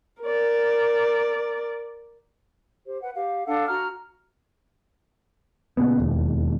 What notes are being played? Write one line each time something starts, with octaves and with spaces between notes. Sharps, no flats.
A#4 D5
G4 C5
B4 F#5
G4 F5
D4 A4 F5 F#5
F#4 A#5 F6
A#2 C#3 B3
E1 D#2